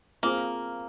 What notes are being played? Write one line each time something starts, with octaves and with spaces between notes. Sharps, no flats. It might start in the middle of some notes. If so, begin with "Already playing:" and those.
A#3 C4 F4 G#4 C5